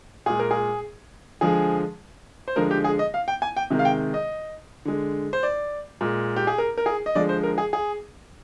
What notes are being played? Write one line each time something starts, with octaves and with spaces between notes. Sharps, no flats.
A#2 G#3 G#4
A#4
G#4
D3 F3 G#3 G#4
C5
D3 F3 G#3 A#4
G4
G#4
D#5
F5
G5
G#5
G5
C3 D#3 G#3
F5
G5
D#5
D3 G#3
C5
D5
A#2 G#3
G4
G#4
A#4
A#4
G#4
D#5
D3 F3 G#3 D5
C5
A#4
G#4
G#4